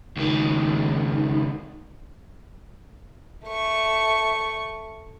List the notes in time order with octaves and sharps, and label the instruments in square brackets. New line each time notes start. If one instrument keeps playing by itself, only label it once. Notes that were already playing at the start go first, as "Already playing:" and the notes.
[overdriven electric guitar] C#2 D#3
[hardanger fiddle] A3 C#6